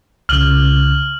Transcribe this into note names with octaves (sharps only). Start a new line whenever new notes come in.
C2 C#3 F6 F#7